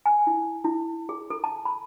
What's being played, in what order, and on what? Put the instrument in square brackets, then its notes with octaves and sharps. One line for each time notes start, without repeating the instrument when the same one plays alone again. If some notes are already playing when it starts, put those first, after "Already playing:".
[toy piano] G#5
E4
E4
G#4
A4
A5
B5